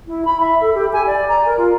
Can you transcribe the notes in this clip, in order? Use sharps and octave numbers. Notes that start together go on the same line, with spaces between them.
E4
B5
E5
A4
G4
G#5
D5
A#5
A#4
F4